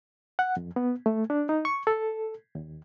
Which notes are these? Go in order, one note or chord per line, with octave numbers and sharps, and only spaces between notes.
F#5
F2
B3
A3
D4
D#4
C#6
A4
D#2